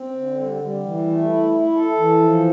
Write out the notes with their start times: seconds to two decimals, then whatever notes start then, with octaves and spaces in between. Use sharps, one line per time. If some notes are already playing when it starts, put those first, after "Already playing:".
Already playing: C4
0.16 D3
0.39 G3
0.62 G3
0.85 E3
1.07 A3
1.29 E4
1.53 E4
1.75 A4
1.98 E3
2.21 F3